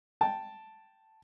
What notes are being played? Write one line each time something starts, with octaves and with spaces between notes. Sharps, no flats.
G5 A5